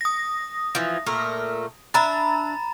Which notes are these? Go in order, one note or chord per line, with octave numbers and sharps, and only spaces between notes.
D#6 A#6
E3 F3
A#2 A3 A#4
D4 E5 A#5 B5 A6